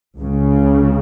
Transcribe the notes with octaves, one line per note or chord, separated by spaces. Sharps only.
C#2 C#3